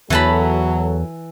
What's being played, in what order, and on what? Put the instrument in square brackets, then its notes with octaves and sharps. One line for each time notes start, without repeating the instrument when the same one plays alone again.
[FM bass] E2 [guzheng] E3 A5 B5 [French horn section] F#3 A4